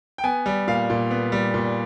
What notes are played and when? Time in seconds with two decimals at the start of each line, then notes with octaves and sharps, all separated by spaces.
0.18 G5
0.24 B3 G#5
0.46 G3
0.67 A#2 F5
0.90 A#2
1.11 B3
1.32 G3
1.54 A#2